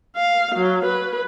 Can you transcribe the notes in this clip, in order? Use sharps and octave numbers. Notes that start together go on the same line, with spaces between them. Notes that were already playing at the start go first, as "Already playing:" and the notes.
F5
F#3
B4